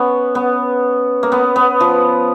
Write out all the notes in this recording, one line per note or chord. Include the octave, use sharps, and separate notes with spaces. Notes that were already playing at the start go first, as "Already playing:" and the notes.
Already playing: B3 C#4
B3
A#3
B3
B3
F3